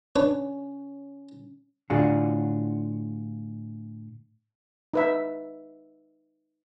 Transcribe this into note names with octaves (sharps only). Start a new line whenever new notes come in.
C#4 D4 B4 C#5
A2 D3 D4 F4 F#4 G#4
D#4 B4 E5